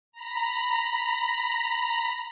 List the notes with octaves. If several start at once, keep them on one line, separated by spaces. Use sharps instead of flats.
A#5 B5